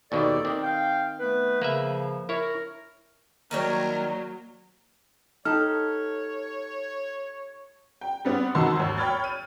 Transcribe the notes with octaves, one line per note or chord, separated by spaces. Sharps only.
D#2 B2 D#3 G4 A4 D5
D#3 C4
F5 G5
A3 B3 B4
C#3 F3 A#3 B4 E5
E4 A#4 C#5
D#3 F#3 G3 A#3 A#4 C#5
D#4 G4 A4 C#5 F6
G5
G3 B3 C4
F2 D#3 F#4 A5 C6 E6
G#1 D#2
C#5 G5 B5 F6 G#6 A6
D#7